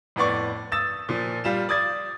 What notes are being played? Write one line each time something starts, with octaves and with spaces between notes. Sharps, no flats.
F2 A2 B3 D5 C#6
D#6 E6 A6 E7
A#2 F3
G3 F4 E7
D5 D#6 G#6 A6